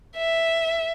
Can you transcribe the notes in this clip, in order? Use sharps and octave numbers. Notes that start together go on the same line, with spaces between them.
E5